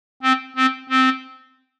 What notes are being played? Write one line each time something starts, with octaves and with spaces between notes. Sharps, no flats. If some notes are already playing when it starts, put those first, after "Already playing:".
C4
C4
C4